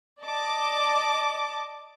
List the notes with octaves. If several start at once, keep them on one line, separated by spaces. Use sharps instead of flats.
D5 D#5 A5 D6